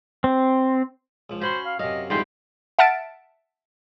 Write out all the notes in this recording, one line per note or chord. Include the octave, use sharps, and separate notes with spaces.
C4
C#2 F3
C#4 F#4 C5 B5 C6
F5
F#2 C3 D#5 F5
F2 G#2 E3 G3 G4 G5 C6
E5 F#5 A5 F6 A6 D7